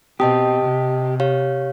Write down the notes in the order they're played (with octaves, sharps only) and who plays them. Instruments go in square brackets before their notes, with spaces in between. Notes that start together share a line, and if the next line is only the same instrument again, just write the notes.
[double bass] B2 C4 [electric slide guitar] G4 [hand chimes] D#5 A5 D#6
[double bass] C3
[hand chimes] G4 C#5 F5